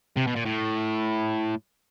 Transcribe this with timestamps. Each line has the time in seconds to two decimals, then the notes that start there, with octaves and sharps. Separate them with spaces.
0.17 C3
0.27 B2
0.36 A#2
0.46 A2